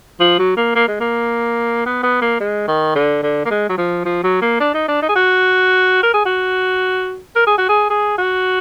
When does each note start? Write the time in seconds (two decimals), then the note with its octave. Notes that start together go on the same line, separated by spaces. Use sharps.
0.20 F3
0.39 F#3
0.57 A#3
0.76 A#3
0.88 G#3
1.00 A#3
1.86 B3
2.03 B3
2.22 A#3
2.40 G#3
2.68 D#3
2.95 D3
3.23 D3
3.45 A#3
3.51 G#3
3.69 F#3
3.77 F3
4.05 F3
4.24 F#3
4.42 A#3
4.60 D4
4.74 D#4
4.88 D4
5.02 D#4
5.09 G#4
5.15 F#4
6.03 A#4
6.14 G#4
6.26 F#4
7.36 A#4
7.47 G#4
7.58 F#4
7.69 G#4
7.90 G#4
8.18 F#4